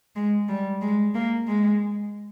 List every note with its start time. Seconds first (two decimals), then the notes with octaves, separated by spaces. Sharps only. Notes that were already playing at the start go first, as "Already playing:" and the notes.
0.15 G#3
0.49 G3
0.82 G#3
1.15 A#3
1.47 G#3